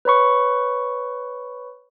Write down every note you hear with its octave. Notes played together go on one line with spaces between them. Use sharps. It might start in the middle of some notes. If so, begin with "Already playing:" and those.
B4 C#5 B5 C#6